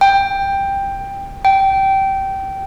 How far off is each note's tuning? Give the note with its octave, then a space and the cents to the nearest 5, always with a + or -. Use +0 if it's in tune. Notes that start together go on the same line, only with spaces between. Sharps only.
G5 +10
G5 -15